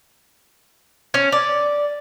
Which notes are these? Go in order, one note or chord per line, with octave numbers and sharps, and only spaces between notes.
C#4
D5